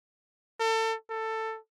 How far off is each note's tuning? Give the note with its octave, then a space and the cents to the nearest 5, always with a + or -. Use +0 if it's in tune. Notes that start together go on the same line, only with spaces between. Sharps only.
A4 +30
A4 +15